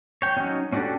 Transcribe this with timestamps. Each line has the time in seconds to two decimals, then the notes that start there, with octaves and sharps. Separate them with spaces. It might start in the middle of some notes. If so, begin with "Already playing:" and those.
0.22 C#5 G5
0.37 F#3 C#4 D#4
0.72 C#4 D4 F#4 G4 A4